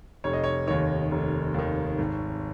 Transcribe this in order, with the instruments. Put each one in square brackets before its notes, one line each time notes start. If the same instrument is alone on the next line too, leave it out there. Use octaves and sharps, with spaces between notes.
[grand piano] F1 C#5
D#5
C#5
D#2 D#3 C#5
F1
D#2 D#3
G#1